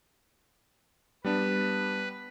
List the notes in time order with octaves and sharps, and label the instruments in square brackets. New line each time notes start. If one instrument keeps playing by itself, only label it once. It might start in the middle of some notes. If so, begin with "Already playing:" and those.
[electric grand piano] G3 B3 D4 [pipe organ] B4